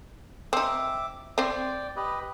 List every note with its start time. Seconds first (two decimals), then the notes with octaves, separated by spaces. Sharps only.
0.53 C4 D#4 E5 D6
1.38 C4 C5 D5 G5
1.96 G4 B4 D#5